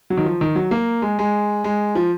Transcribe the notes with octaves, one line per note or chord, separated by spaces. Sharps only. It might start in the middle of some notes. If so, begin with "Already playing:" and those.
F#3
D#3
F3
D#3
F#3
A#3
G#3
G#3
G#3
F3